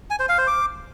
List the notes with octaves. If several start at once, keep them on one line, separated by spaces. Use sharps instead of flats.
G#5
C5
F5
C5
D6